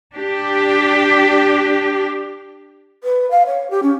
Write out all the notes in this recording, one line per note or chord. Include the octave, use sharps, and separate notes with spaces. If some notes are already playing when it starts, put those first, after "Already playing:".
D4 G4
B4
F5
C#5
G4
C#4